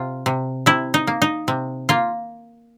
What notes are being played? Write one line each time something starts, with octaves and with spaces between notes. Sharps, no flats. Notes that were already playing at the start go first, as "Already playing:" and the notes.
Already playing: C3 F4
C3
C3 E4
D#4
A#3
D#4
C3
A#3 F4